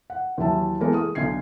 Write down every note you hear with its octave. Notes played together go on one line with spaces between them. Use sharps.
F#5
D#2 E3 F#3 E5 A5
E3 G#3 A#3 B3 A4 A#4
D#6
B1 D3 G#6 C7